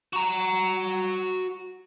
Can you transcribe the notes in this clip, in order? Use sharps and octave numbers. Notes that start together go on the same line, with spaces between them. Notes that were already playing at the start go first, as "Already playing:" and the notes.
F#4 A#5